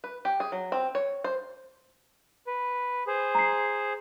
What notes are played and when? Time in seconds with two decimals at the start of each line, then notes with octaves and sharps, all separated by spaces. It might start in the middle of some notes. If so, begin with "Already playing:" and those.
0.04 B4
0.25 G4
0.40 G#4
0.52 F#3
0.72 C4
0.95 C#5
1.24 C5
2.47 B4
3.07 G#4 C5
3.35 A#5 C7